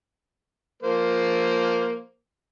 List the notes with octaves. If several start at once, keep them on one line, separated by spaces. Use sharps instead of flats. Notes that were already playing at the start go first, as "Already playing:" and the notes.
F3 A#3 C5